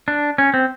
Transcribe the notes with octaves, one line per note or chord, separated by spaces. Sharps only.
D4
C#4
C4